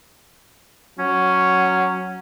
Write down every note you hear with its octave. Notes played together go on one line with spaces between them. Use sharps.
F#3 C#4